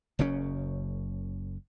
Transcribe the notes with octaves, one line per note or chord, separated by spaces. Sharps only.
F#1 F#2 C#3 C#4